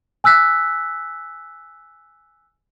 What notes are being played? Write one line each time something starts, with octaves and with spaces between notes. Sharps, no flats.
G#5 E6 F#6 B6